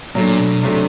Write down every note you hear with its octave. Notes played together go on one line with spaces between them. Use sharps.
A#2 F#3 A3 D4
B2
C3 F#3 A3 D4